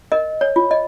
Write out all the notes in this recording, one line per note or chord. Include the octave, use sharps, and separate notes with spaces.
A#4 D#5
C#5
F4
D#5